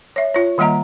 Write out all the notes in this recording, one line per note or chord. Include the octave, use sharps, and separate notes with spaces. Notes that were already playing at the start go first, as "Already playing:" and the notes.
C#5 E5
F4 C#5
D#3 G3 A#3 D#5 F#5 A#5